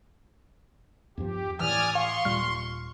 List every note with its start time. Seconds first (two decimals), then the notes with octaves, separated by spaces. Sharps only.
1.18 E2 G2 F3 G4
1.60 A2 E3 D5 G#5 D#6 F6
1.95 F5 C6 C#6
2.25 D#1 A#2 G3 F6